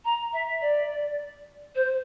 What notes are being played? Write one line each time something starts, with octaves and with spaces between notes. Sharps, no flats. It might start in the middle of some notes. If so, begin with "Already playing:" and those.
A#5
E5
D5
C5